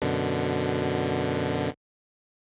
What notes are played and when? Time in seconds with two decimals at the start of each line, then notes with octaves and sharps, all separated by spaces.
0.02 F#2 B2 D3